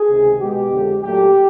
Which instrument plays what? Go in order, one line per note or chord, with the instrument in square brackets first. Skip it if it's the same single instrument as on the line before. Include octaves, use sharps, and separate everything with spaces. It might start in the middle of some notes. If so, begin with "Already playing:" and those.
Already playing: [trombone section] G#4
C#2 C3 D#3
B2 G#3 B3 G4
F2 D3 F3 G#3
A#2 F#3 A3 G4